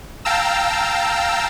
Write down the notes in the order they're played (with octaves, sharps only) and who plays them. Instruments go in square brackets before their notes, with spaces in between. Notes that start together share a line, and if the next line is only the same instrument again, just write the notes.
[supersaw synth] F5 G5 A5 A#5 E6